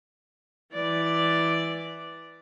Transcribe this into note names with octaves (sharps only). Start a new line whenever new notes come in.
E3 D5